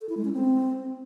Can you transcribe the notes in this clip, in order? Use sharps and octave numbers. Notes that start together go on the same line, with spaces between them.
A4
E4
G#3
C#4
C4